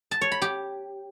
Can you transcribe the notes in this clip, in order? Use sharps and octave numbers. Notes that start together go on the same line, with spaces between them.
A5
C#5
B5
G4